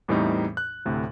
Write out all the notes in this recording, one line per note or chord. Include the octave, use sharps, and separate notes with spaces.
E2 A2 E3 G3 C4 D#4
F#6
D2 A2 C3